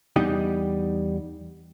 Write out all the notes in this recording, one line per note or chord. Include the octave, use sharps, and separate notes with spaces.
E2 G3 B3 D#4 D#5 G5